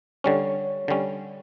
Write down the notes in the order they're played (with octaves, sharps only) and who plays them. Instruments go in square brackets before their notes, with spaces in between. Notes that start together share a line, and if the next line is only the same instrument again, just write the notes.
[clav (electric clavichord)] D3 G3 C#4 [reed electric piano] C#5
[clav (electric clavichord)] D3 G3 C#4